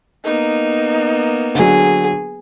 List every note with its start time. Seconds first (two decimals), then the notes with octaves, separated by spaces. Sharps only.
0.25 A#3 B3 D#4
1.55 D3 F#3 G#4